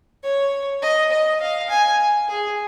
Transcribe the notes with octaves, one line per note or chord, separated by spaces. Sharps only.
C#5
D#5
D#5
F5
G#5
G#4